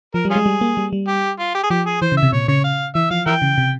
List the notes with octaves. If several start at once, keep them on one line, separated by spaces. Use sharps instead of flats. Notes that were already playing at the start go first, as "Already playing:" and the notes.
F3 A#4
G3
C#4 F4 G#4
G#3
G3
A#3
G3
G3
G4
F4
G4
G#4
F3 G4
G#4
E3 C5
C#3
E5
C3
A#2 C#5
C#3 C#5
F5
E3 E5
F3 F5
E3 A#4 E5 G5
C#3
C3